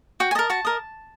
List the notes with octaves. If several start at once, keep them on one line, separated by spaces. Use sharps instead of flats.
F#4 G5
G#5
A#4 D#5 A5
F#4 A5
A#4 D#5